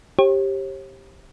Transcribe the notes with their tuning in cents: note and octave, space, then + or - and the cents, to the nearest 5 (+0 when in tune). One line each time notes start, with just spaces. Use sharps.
G4 +0 C#5 -45